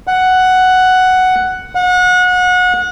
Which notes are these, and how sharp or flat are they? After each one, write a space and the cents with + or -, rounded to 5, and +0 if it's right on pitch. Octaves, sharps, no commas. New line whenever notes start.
F#5 +5
F#5 -30